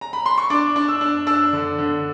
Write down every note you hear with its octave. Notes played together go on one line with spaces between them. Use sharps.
A#5
B5
C6
C#6
D4 D6
D4
E6
D4
D4 E6
D3
D3